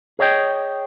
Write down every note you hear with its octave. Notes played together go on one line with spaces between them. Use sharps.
G#4 C#5 D#5 G5